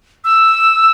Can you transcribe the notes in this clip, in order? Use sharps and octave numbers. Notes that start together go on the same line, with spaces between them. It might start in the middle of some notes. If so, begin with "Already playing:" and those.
E6